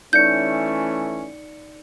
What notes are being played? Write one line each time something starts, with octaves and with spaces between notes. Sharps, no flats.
E3 A3 C#4 D#4 D5 G6 C#7